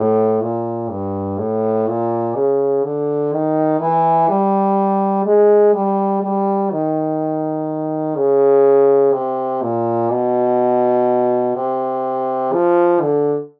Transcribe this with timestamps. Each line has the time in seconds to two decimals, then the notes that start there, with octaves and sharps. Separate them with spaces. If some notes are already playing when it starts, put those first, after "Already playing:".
Already playing: A2
0.41 A#2
0.89 G2
1.39 A2
1.87 A#2
2.35 C#3
2.83 D3
3.33 D#3
3.80 E3
4.29 G3
5.26 G#3
5.74 G3
6.22 G3
6.71 D#3
8.16 C#3
9.13 C3
9.62 A#2
10.11 B2
11.55 C3
12.53 F3
13.01 D3